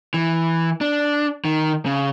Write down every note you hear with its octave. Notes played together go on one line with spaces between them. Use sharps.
E3
D4
D#3
C#3